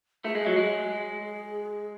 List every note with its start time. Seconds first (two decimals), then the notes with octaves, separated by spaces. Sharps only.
0.25 A3 G#4
0.35 G#3
0.46 F#3
0.56 G#3